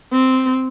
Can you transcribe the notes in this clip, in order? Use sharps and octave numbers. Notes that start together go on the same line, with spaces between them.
C4